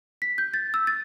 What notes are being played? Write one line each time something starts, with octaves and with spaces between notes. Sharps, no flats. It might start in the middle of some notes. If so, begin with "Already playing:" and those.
B6
G6
A6
E6
A6